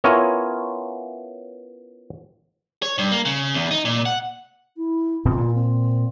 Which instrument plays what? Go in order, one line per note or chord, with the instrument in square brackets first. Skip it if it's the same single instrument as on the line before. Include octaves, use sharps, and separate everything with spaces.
[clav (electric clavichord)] B3 C#4 E4 F4 A#4 C#5
[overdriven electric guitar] C#5
G2
A#3
C#3
E2
D#4
A#2
F#5
[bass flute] E4
[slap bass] D1 B2 C4 [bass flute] F4
[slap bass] A#2
[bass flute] C4